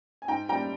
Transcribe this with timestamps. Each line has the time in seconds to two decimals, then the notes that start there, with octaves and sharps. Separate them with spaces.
0.22 G#5
0.28 G#2 G5 A#5
0.49 G3 G5 A#5